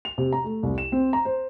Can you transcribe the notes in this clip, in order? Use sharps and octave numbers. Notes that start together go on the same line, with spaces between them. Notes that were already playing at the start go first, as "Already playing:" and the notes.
F7
C3
A#5
A3
C2
E7
C4
A#5
C5